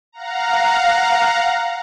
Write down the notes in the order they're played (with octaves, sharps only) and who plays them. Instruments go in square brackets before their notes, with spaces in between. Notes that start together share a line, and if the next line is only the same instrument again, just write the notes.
[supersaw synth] F5 F#5 A#5